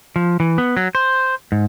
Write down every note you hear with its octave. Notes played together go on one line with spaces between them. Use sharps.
F3
E3
B3
F#3
C5
G#2